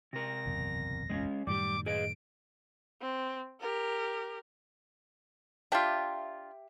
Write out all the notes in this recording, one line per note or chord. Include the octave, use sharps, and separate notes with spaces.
C3 A#4 A#6
F#1 B1 E2
G#3 C4 C#4
F#2 A2 D#3 G3 G4 D6
G#4 B4 D#5 D7
C4
G4 A#4
D4 F4 G4 E5 G5